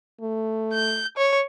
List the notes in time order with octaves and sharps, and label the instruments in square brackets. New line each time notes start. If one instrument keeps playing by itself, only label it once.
[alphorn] A3
[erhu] G6
C#5